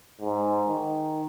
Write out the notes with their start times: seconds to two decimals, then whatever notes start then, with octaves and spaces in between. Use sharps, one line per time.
0.21 G#2
0.68 D#3